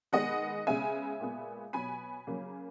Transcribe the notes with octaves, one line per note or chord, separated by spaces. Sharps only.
D#3 G#3 B3 D#5 F#5
C#3 G#3 B3 E5 G#5
A#2 G#3 B3
B2 F#3 B3 G#5 B5
C#3 F#3 A#3